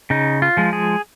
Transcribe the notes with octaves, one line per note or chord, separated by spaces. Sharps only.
C#3 D#4
F4
F3 G#3
G#4